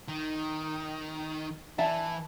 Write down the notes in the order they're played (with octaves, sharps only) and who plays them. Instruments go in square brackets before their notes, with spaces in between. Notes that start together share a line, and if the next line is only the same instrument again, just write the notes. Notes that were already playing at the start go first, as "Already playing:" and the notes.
[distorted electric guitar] D#3
[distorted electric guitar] E3 [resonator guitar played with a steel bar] E5 A5